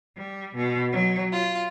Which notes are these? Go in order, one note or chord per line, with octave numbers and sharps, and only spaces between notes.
G3
B2
F#3
F4